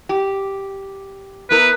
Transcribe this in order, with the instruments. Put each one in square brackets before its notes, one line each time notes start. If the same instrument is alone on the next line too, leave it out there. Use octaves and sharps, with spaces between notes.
[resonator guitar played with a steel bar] G4
[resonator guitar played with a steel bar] B3 E4 A#4 [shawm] B4